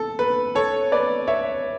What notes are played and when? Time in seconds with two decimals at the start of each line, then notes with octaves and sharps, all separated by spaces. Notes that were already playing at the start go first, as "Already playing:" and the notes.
Already playing: A4
0.19 B4
0.55 A4 C#5
0.92 B4 D5
1.27 C#5 E5